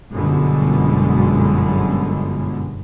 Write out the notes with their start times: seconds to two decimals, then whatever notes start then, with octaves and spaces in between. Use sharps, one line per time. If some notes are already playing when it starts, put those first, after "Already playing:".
0.13 G1 F#2 B2 D3 G#3